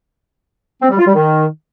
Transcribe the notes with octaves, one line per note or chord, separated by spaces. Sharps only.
C4
G3
F4
G3
D#3